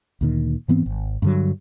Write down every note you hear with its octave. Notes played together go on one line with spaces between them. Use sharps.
D2 A#2 D#3
G#2 E3 B3 C4
G#1
G2 D3 F#3